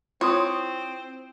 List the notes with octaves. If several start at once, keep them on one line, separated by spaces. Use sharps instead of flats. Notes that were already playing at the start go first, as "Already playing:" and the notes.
C4 E4 F4 C#5 C6 D#6